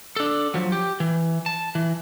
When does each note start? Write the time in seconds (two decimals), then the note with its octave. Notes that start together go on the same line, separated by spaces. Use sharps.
0.16 D4 A4
0.54 F3 F#3
0.72 G4
1.00 E3
1.46 A5
1.75 E3